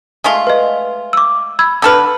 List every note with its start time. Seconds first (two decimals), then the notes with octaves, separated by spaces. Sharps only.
0.24 G#3 A3 F4
0.47 B4 D#5
1.13 D6 E6
1.59 B5 E6 G#6
1.82 D3 A4 B4 E6 F6